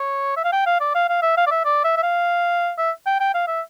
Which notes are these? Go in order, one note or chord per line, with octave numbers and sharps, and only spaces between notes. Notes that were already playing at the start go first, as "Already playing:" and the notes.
Already playing: C#5
E5
F5
G5
F5
D5
F5
F5
E5
F5
D5
E5
D5
E5
E5
F5
E5
G5
G5
F5
E5